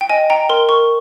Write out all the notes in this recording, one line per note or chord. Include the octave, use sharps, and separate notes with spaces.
G5
D#5 G#5
G5 A#5
A#4 C6
A#4 C#6